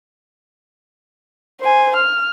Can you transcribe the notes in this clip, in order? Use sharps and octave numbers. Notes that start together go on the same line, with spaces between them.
C5 G#5
F6